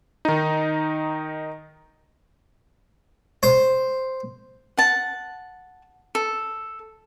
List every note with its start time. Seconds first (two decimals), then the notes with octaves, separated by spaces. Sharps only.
0.25 D#3 D#4
3.43 C5
4.77 F#5 A5
6.15 A4